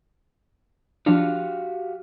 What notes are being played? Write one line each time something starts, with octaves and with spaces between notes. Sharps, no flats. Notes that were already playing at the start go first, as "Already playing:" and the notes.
F3 D4 F#4 G4 F5